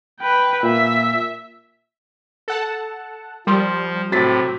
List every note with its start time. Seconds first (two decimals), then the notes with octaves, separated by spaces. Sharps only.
0.21 B4 G5
0.63 A#2 E5
2.48 A4 F#5 A5
3.47 F3 G3 A#4 C6 D#6
4.12 A2 C3 F#3 A6 B6